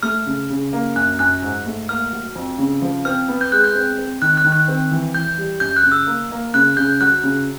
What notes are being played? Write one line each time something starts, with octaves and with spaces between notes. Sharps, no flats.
A3 F6
C#3
C#3
A#3
F#2 F#6
F#2 F#6
G#2
A3
A#3 F6
F#3
F2
C#3
F3
C4 F6
B3
G6
G#3 F#6
G6
C4
C4
D#3 F#6
F#6
D#3
F#6
C4
E3
E3 G6
G3
F#2 G6
F#6
C#3
E6
A#3
A#3
C#3 F#6
C#3 G6
F#3 F#6
C#3